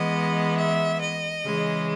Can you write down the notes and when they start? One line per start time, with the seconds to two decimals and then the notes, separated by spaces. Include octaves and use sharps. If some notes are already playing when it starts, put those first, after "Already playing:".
Already playing: E3 G#3 B3 D#5
0.56 E5
1.00 D#5
1.43 C#3 E3 G#3